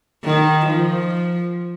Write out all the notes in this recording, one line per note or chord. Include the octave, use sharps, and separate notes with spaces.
D#3
F3